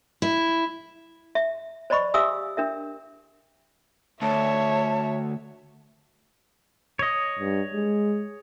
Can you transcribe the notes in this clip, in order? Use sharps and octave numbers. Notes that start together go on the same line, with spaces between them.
E4
E5
C5 D5 D#5 B5 C#6
G4 E5 F5 G#5 D#6 E6
D4 A#4 E5
D2 C#5 E5 A5
C#5 D#5
G2
G#3